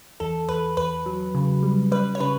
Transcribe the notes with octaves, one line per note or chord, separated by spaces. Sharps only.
E2 A4
E2 B4
E2 B4
F#3
C#3
G3
G3 B4
C#5
C#3 B4